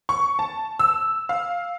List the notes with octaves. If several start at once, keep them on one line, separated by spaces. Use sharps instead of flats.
C#6
A5
E6
F5